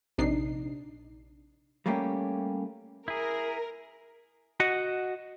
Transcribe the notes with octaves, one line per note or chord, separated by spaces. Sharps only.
A#1 C3 D4 D#4 C7
G3 A3 A#3 C#4 G4
E4 G#4 A#4
F#4 D#5 F#5